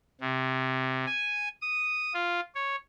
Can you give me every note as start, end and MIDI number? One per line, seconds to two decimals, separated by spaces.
0.21 1.05 48
1.06 1.49 80
1.62 2.13 87
2.14 2.40 65
2.55 2.76 73